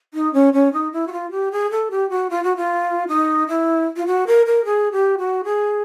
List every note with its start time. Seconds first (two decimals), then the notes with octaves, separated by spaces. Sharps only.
0.14 D#4
0.34 C#4
0.53 C#4
0.73 D#4
0.93 E4
1.07 F#4
1.12 F4
1.31 G4
1.52 G#4
1.71 A4
1.91 G4
2.10 F#4
2.30 F4
2.44 F#4
2.57 F4
3.09 D#4
3.48 E4
3.97 F4
4.07 F#4
4.27 A#4
4.46 A#4
4.65 G#4
4.92 G4
5.18 F#4
5.44 G#4